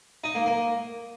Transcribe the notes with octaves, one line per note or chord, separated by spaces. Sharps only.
D#4
A#3
A#3